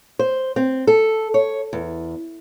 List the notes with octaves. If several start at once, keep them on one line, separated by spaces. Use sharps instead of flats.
C5
C4
A4
C#5
E2